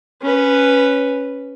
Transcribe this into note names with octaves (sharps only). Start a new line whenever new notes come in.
C#4 B4